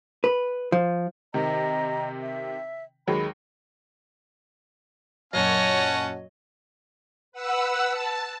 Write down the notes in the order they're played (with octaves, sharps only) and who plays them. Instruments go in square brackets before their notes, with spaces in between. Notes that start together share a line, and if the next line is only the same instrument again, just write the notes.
[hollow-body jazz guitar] B4
F3
[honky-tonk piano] C3 D#3 [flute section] D#5 A#5
[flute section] E5
[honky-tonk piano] D#2 F#3 G#3 [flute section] B5
[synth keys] F#2 A#2 F#3 [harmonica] C#4 F#5 A5 [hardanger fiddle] C#5 D#5
[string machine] B4 F#5 E6
A5